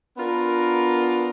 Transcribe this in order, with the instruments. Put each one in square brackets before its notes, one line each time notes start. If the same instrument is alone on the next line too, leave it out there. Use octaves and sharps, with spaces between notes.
[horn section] B3 D4 F4 A#4